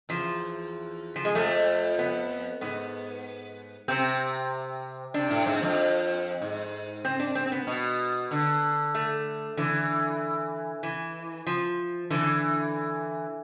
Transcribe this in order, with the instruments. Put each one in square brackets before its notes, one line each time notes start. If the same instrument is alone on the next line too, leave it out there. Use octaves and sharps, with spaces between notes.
[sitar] E2 [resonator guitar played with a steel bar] F3
[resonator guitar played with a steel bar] F3
G#3
[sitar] F2 [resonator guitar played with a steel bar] A3
[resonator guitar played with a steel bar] B3
[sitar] G#2 [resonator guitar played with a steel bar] B3
[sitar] C3 [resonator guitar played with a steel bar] C4
[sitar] C3 [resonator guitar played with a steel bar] D4
[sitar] A2
[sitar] G#2 [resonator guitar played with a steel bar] C4
[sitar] F2
G#2
[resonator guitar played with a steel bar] C4
D4
C4
C4
B3
[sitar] B2
D3
[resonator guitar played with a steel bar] A3
[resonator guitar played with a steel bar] D3 [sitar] E3
[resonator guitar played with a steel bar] E3
F3
[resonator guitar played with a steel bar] D3 [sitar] E3